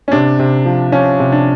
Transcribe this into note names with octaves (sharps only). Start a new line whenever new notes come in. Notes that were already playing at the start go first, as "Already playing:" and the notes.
C#4
C3 D4
C3
F3
F3 C#4
C3
D4